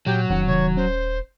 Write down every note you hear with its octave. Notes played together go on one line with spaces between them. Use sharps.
A#2 F#3 G4
D#1 F2 D#3 C#4 F#5
C3 D#3 C#5
C#4 C5